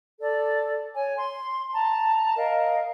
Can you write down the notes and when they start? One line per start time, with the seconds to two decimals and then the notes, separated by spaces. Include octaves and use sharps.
0.20 A4 D5
0.95 C#5 G#5
1.18 C6
1.73 A5 A#5
2.36 A#4 D#5 F5